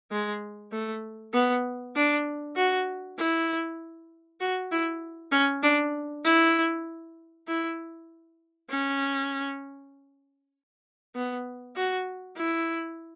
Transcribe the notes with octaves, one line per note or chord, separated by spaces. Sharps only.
G#3
A3
B3
D4
F#4
E4
F#4
E4
C#4
D4
E4
E4
C#4
B3
F#4
E4